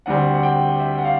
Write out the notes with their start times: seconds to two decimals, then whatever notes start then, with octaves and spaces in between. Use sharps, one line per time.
0.06 D2 D3 G3 C4 F#5
0.34 F#5
0.43 G5
0.80 E5
0.98 F#5
1.04 F5